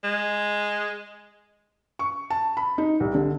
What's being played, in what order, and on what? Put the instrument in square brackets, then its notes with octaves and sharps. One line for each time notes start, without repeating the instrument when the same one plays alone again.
[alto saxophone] G#3
[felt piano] C#6
A5
B5
D#4
C2
D3